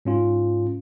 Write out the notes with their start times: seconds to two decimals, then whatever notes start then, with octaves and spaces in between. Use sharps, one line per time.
0.05 G#2 C#4 F4